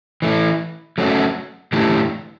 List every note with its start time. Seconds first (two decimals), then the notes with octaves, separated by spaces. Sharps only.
0.22 E3 A3 E4
0.98 F#3 A3 C#4 F#4
1.73 E2 D3 A3 E4 G4